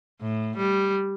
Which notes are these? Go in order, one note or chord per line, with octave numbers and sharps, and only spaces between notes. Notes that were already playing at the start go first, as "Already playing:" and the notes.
A2
G3